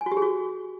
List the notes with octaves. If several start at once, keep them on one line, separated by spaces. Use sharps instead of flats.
G#5
F#4
G4
G#4
F#4